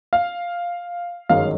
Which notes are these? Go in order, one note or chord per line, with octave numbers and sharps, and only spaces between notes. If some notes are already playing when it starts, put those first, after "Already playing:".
F5
G1 F#2 D#3 G#3 F5